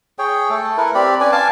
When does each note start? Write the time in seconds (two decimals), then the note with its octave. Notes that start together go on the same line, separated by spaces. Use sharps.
0.18 G#4 C#5 G5
0.50 A3 A4
0.77 E4 A#4 B4
0.95 C4 G4 D5 B5
1.20 C#4 B4 D5 G#5
1.32 F5 G#5 A5 D6